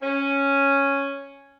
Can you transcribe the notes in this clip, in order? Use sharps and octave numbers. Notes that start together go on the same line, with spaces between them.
C#4